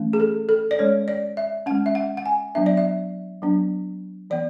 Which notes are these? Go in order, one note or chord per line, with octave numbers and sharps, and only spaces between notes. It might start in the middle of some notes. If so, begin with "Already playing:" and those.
Already playing: E3 A3 C#4
G#4
A4
A4
D5
G#3 C#4 C#5
D5
E5
G#3 C#4 F#5
E5
F#5
F#5
G#5
F#3 B3 D4 E5
D5
E5
F#3 B3 D4
E3 B3 D5